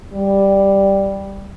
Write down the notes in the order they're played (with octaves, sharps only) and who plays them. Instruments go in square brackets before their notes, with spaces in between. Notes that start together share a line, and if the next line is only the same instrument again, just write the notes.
[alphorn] G3